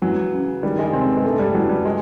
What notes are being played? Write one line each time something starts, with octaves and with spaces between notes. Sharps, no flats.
E3 F#3
C#3
D#3 G3
G#3
C3 C4
B3
G#3
G2 A3
G3
E3 F#3
G3
G#3